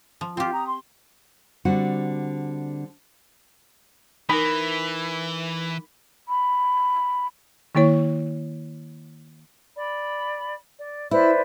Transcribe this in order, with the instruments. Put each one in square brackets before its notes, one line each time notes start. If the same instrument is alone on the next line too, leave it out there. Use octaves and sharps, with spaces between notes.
[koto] F3
[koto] C4 G4 [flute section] F4
[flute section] A#5 D#6
C6
[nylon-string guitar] D3 G3 C4 F#4
[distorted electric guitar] E3 [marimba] D#4 A#4 [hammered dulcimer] B5
[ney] B5
[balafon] D#3 A#3 E4 C#5
[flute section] D5 B5
D5
[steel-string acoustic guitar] E4 [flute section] B4 C5 D5